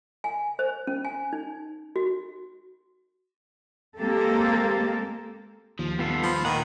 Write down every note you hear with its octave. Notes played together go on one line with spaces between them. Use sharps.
G#5
C5
C#4
G#5
D#4
F#4
G#3 A#3 C4 G4 A4
D#2 F3
G3 A#3 B3 F4 A4
G2 F3 B5
A#2 D#3 B4 F#5